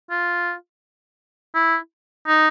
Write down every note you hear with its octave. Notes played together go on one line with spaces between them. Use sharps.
F4
E4
D#4